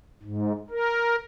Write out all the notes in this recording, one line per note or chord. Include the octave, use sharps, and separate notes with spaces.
G#2
A#4